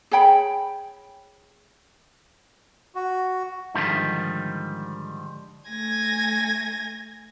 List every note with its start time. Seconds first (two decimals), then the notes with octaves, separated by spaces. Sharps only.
0.11 G#4 C#5 G5 B5
2.95 F#4
3.74 G#2 D3 D#3 F3 G3
5.69 A3 G#5 G#6 A#6